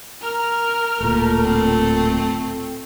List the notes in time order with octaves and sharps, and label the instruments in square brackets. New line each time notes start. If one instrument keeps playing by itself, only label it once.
[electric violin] A#4 F6
[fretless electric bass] D1 A#2 [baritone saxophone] A3
[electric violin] C4